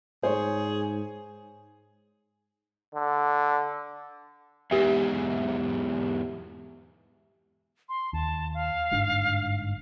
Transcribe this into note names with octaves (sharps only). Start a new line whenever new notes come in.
G#2 G#4 C5 C#5
D3
E2 G#2 G4 E5
C6
D#2 A5
F5
G1 G#2 D4